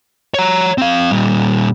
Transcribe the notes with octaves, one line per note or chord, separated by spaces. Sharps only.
C#5 A#5
C4 F5
A#2 G3